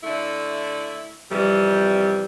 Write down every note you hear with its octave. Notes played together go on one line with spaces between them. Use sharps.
D3 A3 E4
F2 C3 E3 G3